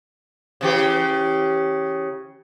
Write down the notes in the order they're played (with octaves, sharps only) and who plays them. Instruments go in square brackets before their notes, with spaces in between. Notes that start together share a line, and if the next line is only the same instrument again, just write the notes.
[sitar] C#3 E3 G4